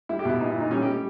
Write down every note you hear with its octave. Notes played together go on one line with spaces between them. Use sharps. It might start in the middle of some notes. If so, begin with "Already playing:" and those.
G3 E4
G4
B2 E4
A#2 D#4
E4
A#2 D#4
G3 C#4
G4
G3